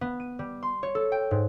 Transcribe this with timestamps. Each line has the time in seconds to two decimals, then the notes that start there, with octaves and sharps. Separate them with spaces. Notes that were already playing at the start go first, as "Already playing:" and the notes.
0.01 B3
0.20 D#7
0.39 G3
0.62 C6
0.83 C#5
0.95 A4
1.12 G5
1.31 G#2